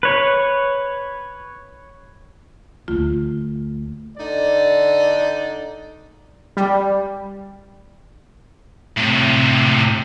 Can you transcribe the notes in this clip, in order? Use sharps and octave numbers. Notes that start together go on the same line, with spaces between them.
B4 C#5
D2 A3 F4
D3 D#4 D5
G3
A2 C3